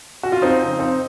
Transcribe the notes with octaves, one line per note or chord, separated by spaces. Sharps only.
F#4
F4
F2 C4 D#4
C#3 F3
F2 C4 D#4